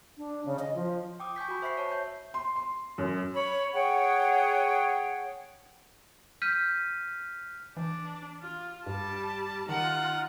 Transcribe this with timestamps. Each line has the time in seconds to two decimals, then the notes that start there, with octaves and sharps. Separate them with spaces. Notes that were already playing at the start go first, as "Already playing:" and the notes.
0.18 D4
0.45 C#3
0.59 D#5
0.75 F3
1.20 G5 D6 D#6
1.36 G#5 C#6 G6 B6
1.48 F#4 B5
1.62 C5 E5 C#6 B6 C7
1.78 C#5 A5
1.92 E5 G6
2.34 C6
2.56 C6
2.98 F#2
3.34 C#5 B5
3.73 G#4 C#5 F#5 G5
6.42 F6 G6 B6 D#7
7.77 E3 D4
8.41 F4
8.86 G2 G3 A5
9.69 D#3 D#4 F4 F#5